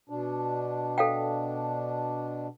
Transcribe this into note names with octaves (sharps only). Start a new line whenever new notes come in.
B2 D4
A4 F5 G5